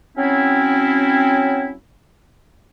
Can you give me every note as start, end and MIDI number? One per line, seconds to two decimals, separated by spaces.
0.17 1.72 54
0.17 1.72 60
0.17 1.72 61
0.17 1.72 64